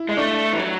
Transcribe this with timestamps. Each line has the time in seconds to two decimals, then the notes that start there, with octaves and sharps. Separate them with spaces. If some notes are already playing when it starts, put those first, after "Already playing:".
Already playing: E4
0.09 G#3
0.17 A3 D4
0.53 E3
0.59 F#3